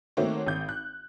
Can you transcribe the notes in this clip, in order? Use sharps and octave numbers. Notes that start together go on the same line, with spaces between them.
D#3 A3 A#3 C4 F#4 C#5
G#1 G6
F#6